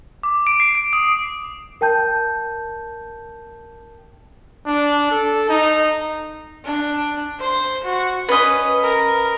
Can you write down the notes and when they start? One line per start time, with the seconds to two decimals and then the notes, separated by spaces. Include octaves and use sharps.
0.23 D6
0.47 D7
0.60 C7
0.75 D7
0.93 D#6
1.81 A#4 G5 A5 G6
4.67 D4
5.11 A4
5.49 D#4
6.65 D4
7.39 C5
7.84 F#4
8.29 C#4 B4 D#5
8.83 A#4